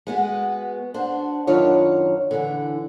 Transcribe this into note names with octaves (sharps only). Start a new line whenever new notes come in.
G#3 B3 F#4
D4 F#4 C5
F#2 D#3 F#3 D4 F4 C#5
D3 E3